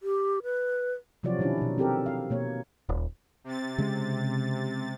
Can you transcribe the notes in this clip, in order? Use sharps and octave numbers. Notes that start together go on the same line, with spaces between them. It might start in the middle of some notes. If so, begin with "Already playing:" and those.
G4
B4
C3 F3 F#3 F4 F#4 D5
B2 D#3 C#4 D4 E4
B2 D#4
C4 G4 A4 A#4
F5
B2 A#3 C#5
D#1
C3 A6
C#3 G#3